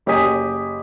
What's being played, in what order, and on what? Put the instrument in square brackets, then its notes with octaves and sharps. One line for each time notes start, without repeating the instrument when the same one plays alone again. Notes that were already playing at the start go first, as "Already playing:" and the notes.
[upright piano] F#1 G4 C#5 G#5 D#6 B6